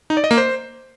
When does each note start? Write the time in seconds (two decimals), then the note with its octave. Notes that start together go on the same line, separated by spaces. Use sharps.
0.10 D#4
0.17 D5
0.24 D#5
0.31 A#3
0.38 C5